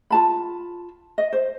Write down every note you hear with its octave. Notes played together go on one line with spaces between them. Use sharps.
F4 A5 B5
D#5
C5